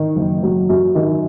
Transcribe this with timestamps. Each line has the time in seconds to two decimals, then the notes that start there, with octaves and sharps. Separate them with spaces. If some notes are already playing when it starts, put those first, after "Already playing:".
Already playing: D#3
0.16 F#1
0.43 F#3
0.69 F#2
0.95 D#3